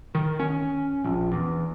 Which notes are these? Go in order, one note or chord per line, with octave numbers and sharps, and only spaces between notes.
D#3
C#4
A#1
E2